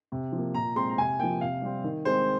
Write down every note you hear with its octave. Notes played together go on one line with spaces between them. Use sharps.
C3
F3
A#3
A#2 A#5
G#3 C4 C6
A#5
C3 G#5
F3 A#3 G5
C3 F5
G3 C4
D#3
G#3 C4 C5